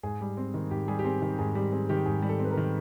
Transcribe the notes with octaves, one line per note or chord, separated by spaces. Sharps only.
G#2 G#4
G3
C4
D#3
G#2 G4
G3 G#4
G4
C4 G#4
D#3 G4
G#2 G#4
G3 G4
C4 G#4
D#3 G4
G#2 G#4
G3
A4
C4
B4
A#4
D#3